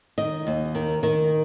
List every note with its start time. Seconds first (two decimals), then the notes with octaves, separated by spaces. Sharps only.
0.18 D#3 D#5
0.47 D#2
0.75 D#3
1.03 D#3